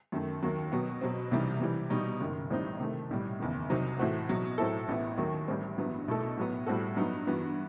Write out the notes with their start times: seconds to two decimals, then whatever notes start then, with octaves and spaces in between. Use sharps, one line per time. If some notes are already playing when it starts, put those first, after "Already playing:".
0.12 F#2 D#3 A3
0.43 D#2 D#3 F#3
0.72 B2 F#3 B3
1.01 B2 F#3 C4
1.31 C2 C3 E3 G3 D#4
1.60 C3 E3 G3
1.90 B2 G3 D#4
2.20 F#1 F#2 D#3
2.50 A1 A2 G3 C4 D#4
2.80 C3 D#3 A3
3.10 B1 A2 G3
3.39 F#1 E2 D#3
3.70 C2 C3 F#3 C4 D#4
3.99 A2 E3 A3 C4 F#4
4.29 B1 B2 F#3
4.58 A2 F#3 C4 E4 A4
4.88 A1 A2 E3 B3 E4
5.18 D#2 D#3 F#3
5.48 A1 A2 G3 C4
5.77 A1 G2 F#3 B3 E4
6.08 B1 B2 A3 E4 A4
6.37 A2 F#3 B3
6.66 A2 G3 C4 F#4 A4
6.96 G2 F#3 B3 D#4
7.27 G2 E3 B3 F#4